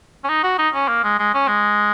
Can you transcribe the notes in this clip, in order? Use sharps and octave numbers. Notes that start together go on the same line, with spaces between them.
C#4
D#4
F#4
D#4
C#4
A#3
G#3
G#3
C#4
G#3